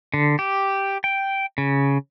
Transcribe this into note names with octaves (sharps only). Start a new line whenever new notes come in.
D3
G4
G5
C#3